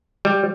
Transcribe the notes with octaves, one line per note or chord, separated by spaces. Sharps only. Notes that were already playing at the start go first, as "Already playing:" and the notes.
G3